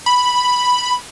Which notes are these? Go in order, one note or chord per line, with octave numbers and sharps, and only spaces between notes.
B5